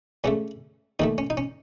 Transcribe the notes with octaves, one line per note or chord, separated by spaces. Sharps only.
C#2 C#3 A3 C#4
D#2 D#3 A3 D#4
C#4
D#4
C#4